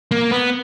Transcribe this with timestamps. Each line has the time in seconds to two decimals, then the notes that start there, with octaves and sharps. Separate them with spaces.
0.11 A#3
0.31 B3